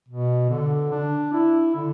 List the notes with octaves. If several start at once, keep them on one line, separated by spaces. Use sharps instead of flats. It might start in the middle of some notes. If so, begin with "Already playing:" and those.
B2
D3
D4
E4
D3